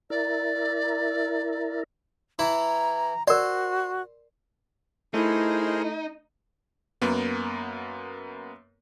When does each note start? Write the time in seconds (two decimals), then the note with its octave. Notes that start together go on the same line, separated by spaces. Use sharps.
0.10 E4 A#4 D5
2.39 E3 E4 A#5
3.27 F#4 A#4 C5 D5
5.14 A3 D#4 E4 G#4 A#4 C5
7.02 F#2 A#3 B3